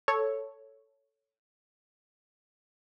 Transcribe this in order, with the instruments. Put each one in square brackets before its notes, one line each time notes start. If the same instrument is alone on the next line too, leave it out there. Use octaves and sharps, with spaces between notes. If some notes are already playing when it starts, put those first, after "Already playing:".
[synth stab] A4 C#5